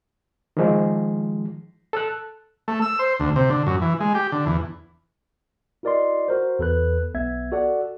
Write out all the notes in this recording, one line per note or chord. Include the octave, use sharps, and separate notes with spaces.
D#3 F3 G#3
A4 E6 F#6
A3
E6
C5
D2
C3
D3
F#2
E3
G#3
G4
D3
E2
E4 F#4 A#4 D5 D#5 C6
F#4 A#4 C5
E2 A4 B4 F#6
B1 B3 E5 G#6
F#4 A4 D5 F#5